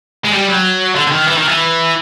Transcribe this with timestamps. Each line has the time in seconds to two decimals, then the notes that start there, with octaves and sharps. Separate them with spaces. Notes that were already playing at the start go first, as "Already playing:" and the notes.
0.24 G#3
0.33 G3
0.48 F#3
0.96 D3
1.07 D3
1.12 D#3
1.27 E3
1.38 D#3
1.48 E3